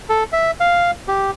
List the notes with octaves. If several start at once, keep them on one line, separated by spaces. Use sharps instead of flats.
A4
E5
F5
G4